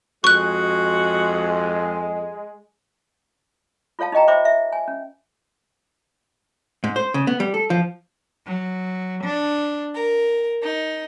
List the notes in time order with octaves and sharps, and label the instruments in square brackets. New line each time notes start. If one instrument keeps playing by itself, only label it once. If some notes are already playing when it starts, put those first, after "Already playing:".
[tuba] F2 [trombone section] G#3 [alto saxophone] F#4 [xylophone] C#6 F#6
[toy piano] F4 A4 C#5 F5 A5
D#4 G4 D#5 G5 A#5
C5 C#5 E5 G5 B5 D6
E5
G#5
C#4
[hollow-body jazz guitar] G#2
C5
C#3
B3
G3
A4
F3
[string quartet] F#3
D4
A#4
D#4